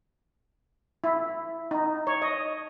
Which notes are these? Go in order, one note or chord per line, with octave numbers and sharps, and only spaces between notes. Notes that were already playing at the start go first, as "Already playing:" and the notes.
E4
D#4
C#5
D#5